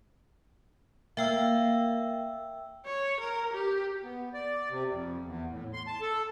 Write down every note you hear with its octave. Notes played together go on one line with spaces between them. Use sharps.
A#3 E5 G5 E6
C#5
A#4
G4
B3
D5
C3
F2
E2
A2
C6
A5
A4